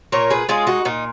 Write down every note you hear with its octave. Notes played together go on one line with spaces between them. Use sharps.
A#2 A#4 C#5
G#4 B4
G#3 C#4 F4 G#4
D#4 F#4
A#2 D#4